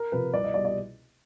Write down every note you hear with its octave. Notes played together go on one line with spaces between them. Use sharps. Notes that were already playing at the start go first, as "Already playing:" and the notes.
Already playing: A#4
C3 F3 B4
C2 D5
D#5
B2 G3 D5
D5